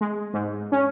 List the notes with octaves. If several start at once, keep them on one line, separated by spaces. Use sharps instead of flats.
G#3
G#2
C#4